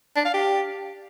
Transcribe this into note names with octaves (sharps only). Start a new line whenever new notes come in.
D4
F5
G4